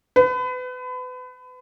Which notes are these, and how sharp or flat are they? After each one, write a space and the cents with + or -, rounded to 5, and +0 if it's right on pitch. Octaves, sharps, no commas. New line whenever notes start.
B4 +35